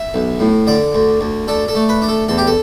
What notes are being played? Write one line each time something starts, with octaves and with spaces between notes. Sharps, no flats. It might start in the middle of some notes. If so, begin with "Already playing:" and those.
Already playing: E5
B1
A2
D3 D5
D2
D2
D4 A4
A4
A3
B4
D4
A4
E2 A4
G4
A4